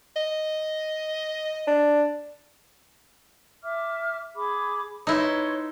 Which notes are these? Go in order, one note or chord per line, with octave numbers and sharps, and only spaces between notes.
D#5
D4
E5 D6 F6
G#4 B5 D6
D#4 E4 B4 C#5 C6